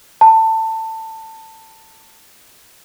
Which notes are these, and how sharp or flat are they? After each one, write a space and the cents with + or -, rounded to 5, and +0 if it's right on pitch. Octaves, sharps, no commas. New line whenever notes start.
A5 +20